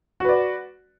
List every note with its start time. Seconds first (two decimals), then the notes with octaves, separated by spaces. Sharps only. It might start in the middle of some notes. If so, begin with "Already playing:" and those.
0.20 F#4
0.25 B4
0.29 D5